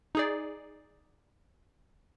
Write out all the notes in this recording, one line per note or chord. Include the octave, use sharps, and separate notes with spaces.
D#4 G#4 D5